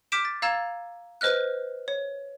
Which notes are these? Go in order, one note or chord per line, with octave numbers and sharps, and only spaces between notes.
D6 F6 G6 B6 D7 E7
A6
F5 A#5 E6 G#6 A6 E7
B4 C5 D#5 F6 F#6
C#5